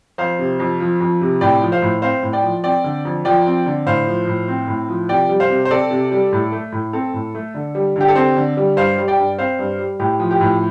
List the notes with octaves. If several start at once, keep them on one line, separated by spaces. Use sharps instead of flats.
F2 C5 F5
C3
F2
F3
F2
C3
A2 D5 G5
F3
C5 F5
A2
C4 C5 F5
A2
D5 G5
F3
C4 D5 G5
D3
F2
F3 D5 G5
C4
D3
A2 C5 F5
F3
A2
C4
A2
F3
C3 D5 G5
G3
C5 F5
C3
C5
C4 A4 D5
C3
G3
A2
A3
A2
C4 A4
A2
A3
D3
G3
D3 G4
A4
C4 G4 C5
D3
G3
G2 C5 F5
G3
D5 G5
G2
C4 C5 F5
G2
G3
A2 G4
F3
G4
A2